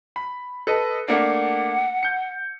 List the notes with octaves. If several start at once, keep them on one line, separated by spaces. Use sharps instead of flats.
B5
A4 B4 D#5
A3 A#3 D4 F#5
G6 C#7